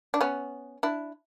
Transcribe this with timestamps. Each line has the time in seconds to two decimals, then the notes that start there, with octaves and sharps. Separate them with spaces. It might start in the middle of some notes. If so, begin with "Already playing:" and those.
0.14 D4
0.21 B3 C#4
0.83 D4 E4